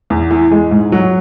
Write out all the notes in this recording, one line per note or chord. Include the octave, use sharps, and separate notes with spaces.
E2
E3
G#3
G#2
F#3